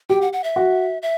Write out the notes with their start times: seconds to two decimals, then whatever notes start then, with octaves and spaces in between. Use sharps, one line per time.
0.10 G4 G5
0.21 F#5
0.33 F#5
0.44 E5
0.56 F#4
1.02 E5